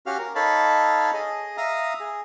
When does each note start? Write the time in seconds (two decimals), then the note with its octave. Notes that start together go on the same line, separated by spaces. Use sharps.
0.06 C#4 F#4 G4 F5 F6
0.19 A#4
0.35 D#4 A4 C#5 F5 A5 B5
1.14 G#4 D#5
1.57 E5 F5 A#5 D#6
2.00 G#4